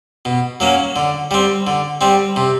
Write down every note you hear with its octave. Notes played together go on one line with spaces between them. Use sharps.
B2
F#3 A#3 C#4
D3
G3 C4
D3
G3 C4
C3